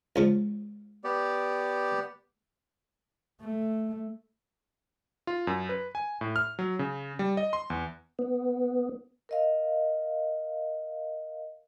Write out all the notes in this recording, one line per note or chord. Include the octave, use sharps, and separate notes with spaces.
C#2 C#3 F3
B3 G4 D5
A3
F4
F#2
B4
G#5
A2
F6
F#3
C#3
G3
D#5
C6
E2
B3
A#4 D#5 F5